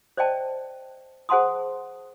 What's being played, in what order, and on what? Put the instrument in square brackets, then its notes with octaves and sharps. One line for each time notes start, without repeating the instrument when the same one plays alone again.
[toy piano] C5 D5 D#5 G5 A5
G#4 C5 F#5 A5 C6 D#6